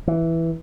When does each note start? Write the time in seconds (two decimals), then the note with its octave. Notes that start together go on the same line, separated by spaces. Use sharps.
0.08 E3